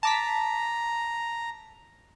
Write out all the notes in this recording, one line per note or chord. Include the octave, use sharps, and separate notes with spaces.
A5 A#5 D6 B6